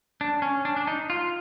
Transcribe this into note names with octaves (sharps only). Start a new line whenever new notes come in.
D4
C#4
D4
D4
D#4
F4